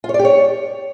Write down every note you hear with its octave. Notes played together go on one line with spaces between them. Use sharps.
F4
C#5
D5
G4
C#5